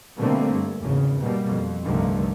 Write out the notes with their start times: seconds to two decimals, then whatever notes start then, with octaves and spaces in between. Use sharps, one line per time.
0.17 B2 D3 G3 A3 A#3 C4
0.51 G2
0.82 G#1 E2 C#3
1.21 B2 G3 A#3
1.50 F2
1.84 C2 G2 D3 D#3 F3 A3